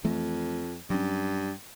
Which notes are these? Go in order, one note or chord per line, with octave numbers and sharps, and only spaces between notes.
F2 E3 A3
G2 F#3 C#4